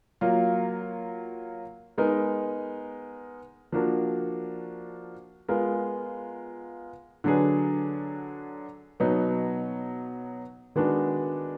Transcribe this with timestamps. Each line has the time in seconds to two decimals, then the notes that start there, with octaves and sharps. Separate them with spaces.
0.21 F#3 A#3 F4
1.98 G#3 B3 D#4 A#4
3.72 F3 A#3 D4 F#4 A#4
5.49 G#3 B3 F4 A#4
7.24 D3 F#3 D4 G#4 B4
9.00 B2 F#3 B3 D#4
10.76 D#3 G#3 B3 D4 F#4